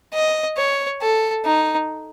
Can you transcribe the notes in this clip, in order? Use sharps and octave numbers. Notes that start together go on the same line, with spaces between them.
D#5
C#5
A4
D#4